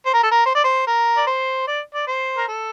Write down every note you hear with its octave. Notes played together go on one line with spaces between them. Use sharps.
C5
A#4
A4
A#4
C5
D5
C5
A#4
D5
C5
D5
D5
C5
A#4
A4